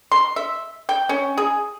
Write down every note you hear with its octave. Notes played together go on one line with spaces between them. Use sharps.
C6
E5
G5
C#4
G#4